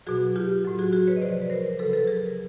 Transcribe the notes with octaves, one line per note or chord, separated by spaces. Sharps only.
B2 F#3 F#4 G#4
F4 G4
A2 F#3
F#4 G#4
F#4 G#4
B4 C#5
D#5
C3 F3 C5 D5
B4
A#4 C5
C#3 F#3 A4 B4
A4 B4
G#4 A#4